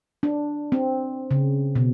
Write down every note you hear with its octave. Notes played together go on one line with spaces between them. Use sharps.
D4
C4
C#3
B2